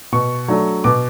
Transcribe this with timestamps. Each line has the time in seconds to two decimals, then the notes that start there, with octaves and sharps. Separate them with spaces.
0.12 B2 C#6
0.48 F#3 A3 D4
0.84 B2 D6